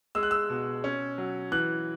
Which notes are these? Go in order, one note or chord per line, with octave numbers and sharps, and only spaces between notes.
G#3 E6
F#6
E6
B2
C#4
F#3
E3 F#6